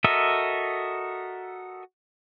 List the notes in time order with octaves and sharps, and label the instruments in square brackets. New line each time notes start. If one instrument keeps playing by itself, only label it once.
[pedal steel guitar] F#4 A4 A#4 D#5 E5